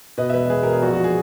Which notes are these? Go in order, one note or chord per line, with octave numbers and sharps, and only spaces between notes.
B2 B4 D#5
E5
E1 B4 D#5
E1 G#4 B4
E1 A#4
G#4
A#1 F#4
F#4
G#4